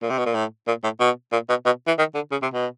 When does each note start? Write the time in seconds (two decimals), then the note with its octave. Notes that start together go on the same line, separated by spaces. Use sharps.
0.02 A#2
0.10 C3
0.18 B2
0.26 A#2
0.34 A2
0.68 A#2
0.84 A2
1.00 B2
1.32 A#2
1.49 B2
1.65 B2
1.87 E3
1.98 D#3
2.15 D3
2.31 C#3
2.42 C3
2.53 B2